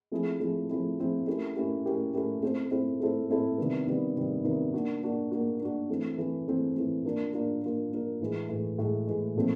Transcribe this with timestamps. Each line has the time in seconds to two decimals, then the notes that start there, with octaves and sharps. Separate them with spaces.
0.12 F3 A3 C4 E4 G#4
0.40 F3 A3 C4 E4 G#4
0.69 F3 A3 C4 E4 G#4
0.99 F3 A3 C4 E4 G#4
1.27 A3 C#4 E4 G4 A#4
1.56 A3 C#4 E4 G4 A#4
1.85 A3 C#4 E4 G4 A#4
2.14 A3 C#4 E4 G4 A#4
2.43 A3 C4 E4 A4 C5
2.71 A3 C4 E4 A4 C5
3.00 A3 C4 E4 A4 C5
3.29 A3 C4 E4 A4 C5
3.58 C3 D#3 G3 B3
3.87 C3 D#3 G3 B3
4.16 C3 D#3 G3 B3
4.44 C3 D#3 G3 B3
4.73 A#3 D4 F#4
5.03 A#3 D4 F#4
5.31 A#3 D4 F#4
5.60 A#3 D4 F#4
5.89 E3 A3 C4
6.18 E3 A3 C4
6.48 E3 A3 C4
6.76 E3 A3 C4
7.05 A#3 D4 F4 A#4
7.33 A#3 D4 F4 A#4
7.62 A#3 D4 F4 A#4
7.92 A#3 D4 F4 A#4
8.20 A2 E3 G#3
8.49 A2 E3 G#3
8.78 A2 E3 G#3
9.07 A2 E3 G#3
9.36 A#2 F3 A3 C4 D#4